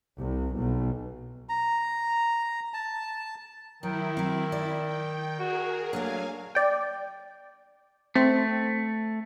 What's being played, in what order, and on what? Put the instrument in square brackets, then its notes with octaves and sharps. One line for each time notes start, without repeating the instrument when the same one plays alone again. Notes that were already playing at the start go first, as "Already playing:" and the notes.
[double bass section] C2
B1
[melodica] A#5
A5
[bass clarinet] D#3 [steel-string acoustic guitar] F#3 [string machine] E4
[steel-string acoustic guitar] F#3 C4
D5
[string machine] G5
[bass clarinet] F#4 [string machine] G#4 A#4
[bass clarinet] F#3 [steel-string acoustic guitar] A3 A#3 D4 [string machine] F5 G#5
[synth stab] D5 G5
[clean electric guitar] A3 [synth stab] C4